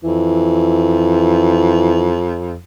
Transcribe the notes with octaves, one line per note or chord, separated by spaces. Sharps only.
F2 E3